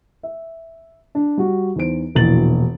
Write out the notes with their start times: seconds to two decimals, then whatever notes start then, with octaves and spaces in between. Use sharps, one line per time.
0.23 E5
1.15 D4
1.37 G3 F#4
1.76 E2 D#4 C5 D7
2.15 E1 A#1 B2 E3 A6 F#7